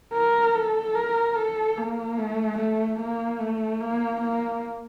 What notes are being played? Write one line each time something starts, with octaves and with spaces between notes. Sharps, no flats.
A#4
A4
A#4
A4
A#3
A3
A3
A#3
A3
A#3
A#3